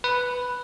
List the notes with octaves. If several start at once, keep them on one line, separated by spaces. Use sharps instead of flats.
B4